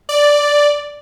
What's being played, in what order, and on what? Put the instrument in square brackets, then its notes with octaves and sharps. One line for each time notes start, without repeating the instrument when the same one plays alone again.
[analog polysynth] D5